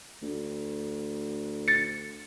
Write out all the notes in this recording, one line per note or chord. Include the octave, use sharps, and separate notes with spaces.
D2
A6 C#7